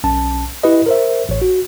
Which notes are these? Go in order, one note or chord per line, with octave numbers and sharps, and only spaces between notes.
B1 C#4 A5
E4 G4 B4 D#5
A#4 C5 E5
A1 C#5
F#4